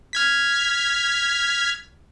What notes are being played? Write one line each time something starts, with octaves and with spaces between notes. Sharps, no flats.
F6 G#6 B6